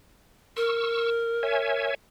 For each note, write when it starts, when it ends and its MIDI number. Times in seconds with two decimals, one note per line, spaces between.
0.57 1.90 70
0.57 1.10 85
0.57 1.10 88
1.43 1.95 73
1.43 1.95 76
1.43 1.95 80